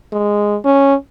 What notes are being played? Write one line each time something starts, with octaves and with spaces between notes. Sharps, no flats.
G#3
C#4